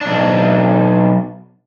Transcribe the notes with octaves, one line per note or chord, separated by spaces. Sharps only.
B1 D4